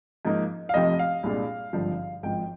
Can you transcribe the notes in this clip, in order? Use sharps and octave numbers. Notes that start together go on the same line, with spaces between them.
G#2 F3 A#3 D#4
F5
F1 F2 C3 F3 C4 D#5
F5
C2 A#2 G#3 D4
G#1 G2 D3 F3
G#1 G#2 F3 G5